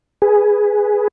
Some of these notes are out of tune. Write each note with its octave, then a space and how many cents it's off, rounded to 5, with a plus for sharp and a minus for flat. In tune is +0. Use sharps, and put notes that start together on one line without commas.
G#4 +0 B4 +0